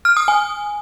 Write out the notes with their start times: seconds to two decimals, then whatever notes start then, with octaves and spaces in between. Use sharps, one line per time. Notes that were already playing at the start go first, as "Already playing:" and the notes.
0.05 F6
0.17 D#6
0.28 G#5